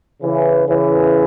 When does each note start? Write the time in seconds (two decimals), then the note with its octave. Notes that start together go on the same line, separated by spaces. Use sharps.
0.20 C#3 E3
0.66 C#3 E3